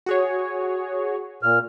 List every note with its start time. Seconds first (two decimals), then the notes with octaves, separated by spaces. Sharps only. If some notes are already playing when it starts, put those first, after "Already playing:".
0.06 F#4 G#4 C#5
1.43 A#2 F6